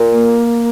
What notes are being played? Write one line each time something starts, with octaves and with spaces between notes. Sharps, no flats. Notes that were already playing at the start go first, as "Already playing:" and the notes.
Already playing: A#2
A#3